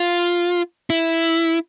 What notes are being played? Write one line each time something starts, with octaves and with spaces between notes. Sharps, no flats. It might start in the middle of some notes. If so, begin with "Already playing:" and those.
Already playing: F4
E4